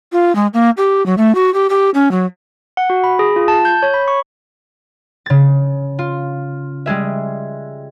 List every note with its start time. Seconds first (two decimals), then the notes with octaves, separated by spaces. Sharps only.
0.12 F4
0.35 G#3
0.54 A#3
0.77 G4
1.06 F#3
1.18 A3
1.35 F#4
1.54 G4
1.70 G4
1.94 C#4
2.11 F#3
2.77 F#5
2.90 F#4
3.04 B5
3.19 G#4
3.36 F4
3.48 A5
3.65 G6
3.83 C#5
3.94 B5
4.08 C#6
5.26 C#3 A6
5.99 F4
6.86 G3 G#3 G#4 E5